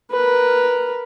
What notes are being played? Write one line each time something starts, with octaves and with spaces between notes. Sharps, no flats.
A#4 B4